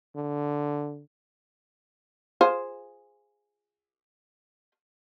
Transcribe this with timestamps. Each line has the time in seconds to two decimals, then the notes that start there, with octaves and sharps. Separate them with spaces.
0.16 D3
2.41 F4 G#4 C5